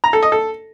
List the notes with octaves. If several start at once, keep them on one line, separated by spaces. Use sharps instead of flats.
A#5
A4
D#5
A4